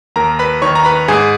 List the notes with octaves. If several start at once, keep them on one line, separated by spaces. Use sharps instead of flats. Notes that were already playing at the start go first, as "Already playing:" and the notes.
D#2 A#4 A#5
B4 B5
D#3 C#5 C#6
A#5
B4 B5
G#2 G#4 G#5